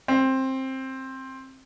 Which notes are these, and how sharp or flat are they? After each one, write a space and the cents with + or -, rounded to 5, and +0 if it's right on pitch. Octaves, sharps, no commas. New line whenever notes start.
C4 +15